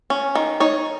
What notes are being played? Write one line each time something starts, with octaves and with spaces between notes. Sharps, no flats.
C#4
D#3
D#4 C#5